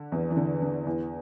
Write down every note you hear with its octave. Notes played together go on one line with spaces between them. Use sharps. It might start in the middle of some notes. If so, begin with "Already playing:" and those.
Already playing: D3
E2 E3
E3
D3
D3
E2 E3